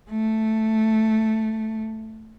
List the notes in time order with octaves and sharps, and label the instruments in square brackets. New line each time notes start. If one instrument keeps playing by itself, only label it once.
[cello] A3